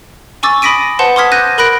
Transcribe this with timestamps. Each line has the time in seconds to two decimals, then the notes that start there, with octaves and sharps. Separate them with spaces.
0.43 G#5 C#6 D6 E6 A6
0.62 B5 D#6 A#6 B6 D7 D#7
0.99 B4 C5 F#5 A5 C6
1.16 C6 D6 D#6 F6 G#6 B6
1.32 F#6 G6 A#6 D#7
1.58 A#4 B5 F#6 A#6 D7